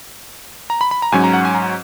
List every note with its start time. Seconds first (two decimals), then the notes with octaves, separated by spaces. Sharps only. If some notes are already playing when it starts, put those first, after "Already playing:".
0.70 A#5
0.81 B5
0.91 B5
1.02 A#5
1.12 G#2 F#3 C#4 G#5
1.24 A#5
1.33 F#5
1.45 G#5
1.55 A#5